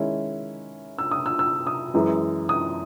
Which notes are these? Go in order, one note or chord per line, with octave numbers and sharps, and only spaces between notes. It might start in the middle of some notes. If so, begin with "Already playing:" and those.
Already playing: D#3 G#3 C#4 E4
E6
D#6
E6
E6
D#6
F#2 E3 G#3
D#6